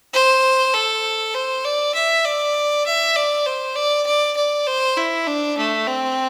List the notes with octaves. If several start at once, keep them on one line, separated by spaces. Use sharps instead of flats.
C5
A4
C5
D5
E5
D5
E5
D5
C5
D5
D5
D5
C5
E4
D4
A3
C4